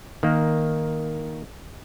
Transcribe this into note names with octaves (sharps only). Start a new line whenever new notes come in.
D#3 A#3